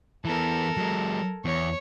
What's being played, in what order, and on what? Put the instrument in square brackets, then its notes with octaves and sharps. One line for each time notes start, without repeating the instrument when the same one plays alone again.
[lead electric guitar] E3 B3 [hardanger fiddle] A4 A#4
[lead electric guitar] F#3 G#3
[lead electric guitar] E2 [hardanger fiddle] C#5